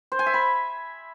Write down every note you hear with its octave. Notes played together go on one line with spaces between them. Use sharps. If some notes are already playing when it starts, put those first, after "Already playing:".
C5
G#5
E5
B5